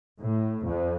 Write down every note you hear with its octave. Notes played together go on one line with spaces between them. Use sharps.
A2
F2